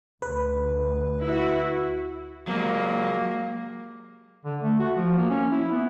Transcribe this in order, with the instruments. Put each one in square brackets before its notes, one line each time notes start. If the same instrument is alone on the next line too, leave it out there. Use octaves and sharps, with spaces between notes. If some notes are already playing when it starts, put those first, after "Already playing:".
[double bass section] D2 [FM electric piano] B4
[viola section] E4 F#4
[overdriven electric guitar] F#3 G#3 [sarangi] A#3
[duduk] D3
A3
F#4
F3
A#3
C#4
E4
B3